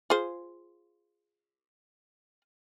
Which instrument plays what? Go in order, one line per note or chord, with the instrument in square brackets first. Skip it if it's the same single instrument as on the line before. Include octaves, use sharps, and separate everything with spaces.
[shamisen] F4 G#4 C5